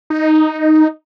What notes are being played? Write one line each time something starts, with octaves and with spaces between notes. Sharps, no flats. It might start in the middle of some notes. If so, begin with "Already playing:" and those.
D#4